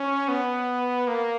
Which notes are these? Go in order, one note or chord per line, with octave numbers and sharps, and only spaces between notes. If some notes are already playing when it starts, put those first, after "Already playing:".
Already playing: C#4
B3
A#3